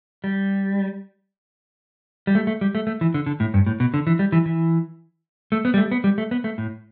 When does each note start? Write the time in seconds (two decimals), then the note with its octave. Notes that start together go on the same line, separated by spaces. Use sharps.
0.24 G3
2.27 G3
2.35 A3
2.47 A3
2.61 G3
2.75 A3
2.87 A3
3.01 E3
3.14 D3
3.26 D3
3.40 A2
3.54 G2
3.66 A2
3.80 B2
3.94 D3
4.07 E3
4.19 G3
4.32 E3
4.46 E3
5.52 A3
5.65 B3
5.74 G3
5.78 A3
5.92 B3
6.04 G3
6.18 A3
6.31 B3
6.44 A3
6.58 A2